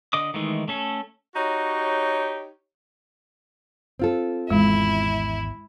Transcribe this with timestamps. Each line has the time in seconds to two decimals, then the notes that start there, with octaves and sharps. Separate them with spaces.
0.13 D3 D#5 D6 D#6
0.34 D#3 E3 G#3 A3 D#4
0.68 A3 C#4 A4
1.35 D#4 F#4 G4 C#5
3.99 C4 F4 A4
4.50 G#1 E2 G#3 E4